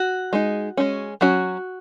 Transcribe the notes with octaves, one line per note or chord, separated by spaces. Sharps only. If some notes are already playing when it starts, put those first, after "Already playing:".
Already playing: F#4
G#3 D#4
G#3 C#4
F#3 C#4 F#4